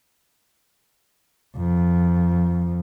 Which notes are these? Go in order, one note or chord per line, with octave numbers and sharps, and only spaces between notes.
F2